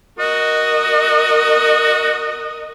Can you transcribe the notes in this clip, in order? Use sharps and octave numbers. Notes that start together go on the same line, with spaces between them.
F#4 A#4 D#5